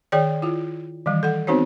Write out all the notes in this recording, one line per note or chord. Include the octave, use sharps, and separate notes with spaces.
D#3 G#4 C#5 D5 G5
E4 F4
D#3 E3 G3
A4 F#5
B3 C4 D#4 F#4 C5 C#5